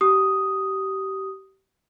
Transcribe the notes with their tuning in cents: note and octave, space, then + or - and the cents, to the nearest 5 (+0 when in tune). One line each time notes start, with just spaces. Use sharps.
G4 -25 D#6 +0